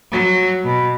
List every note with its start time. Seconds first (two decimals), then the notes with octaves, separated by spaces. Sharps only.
0.12 F#3
0.65 B2